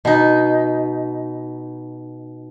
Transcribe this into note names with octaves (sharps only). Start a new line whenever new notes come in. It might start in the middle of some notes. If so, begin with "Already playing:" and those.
B2 D#4